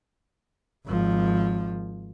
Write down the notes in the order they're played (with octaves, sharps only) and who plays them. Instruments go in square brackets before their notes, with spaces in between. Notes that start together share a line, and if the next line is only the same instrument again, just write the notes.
[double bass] G#1 F3